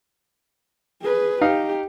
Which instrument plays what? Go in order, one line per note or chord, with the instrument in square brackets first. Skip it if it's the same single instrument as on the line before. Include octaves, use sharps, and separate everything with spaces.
[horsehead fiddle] G#4 B4
[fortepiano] D#4 F5 [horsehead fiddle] G4